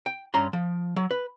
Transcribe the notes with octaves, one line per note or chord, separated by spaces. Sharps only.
G5
G2 C#4 A#5 C6
F3
F#3
B4